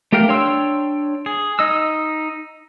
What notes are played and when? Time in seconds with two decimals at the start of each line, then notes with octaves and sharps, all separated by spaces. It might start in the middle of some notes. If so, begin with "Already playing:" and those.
0.12 A3 G4 A#4 F5 G5
0.28 D4 C#5 G5 C6 E6
1.26 G#4
1.59 D#4 D#5 D#6 E6